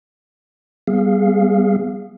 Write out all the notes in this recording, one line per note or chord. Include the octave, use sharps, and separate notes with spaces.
G3 B3 G#4 F5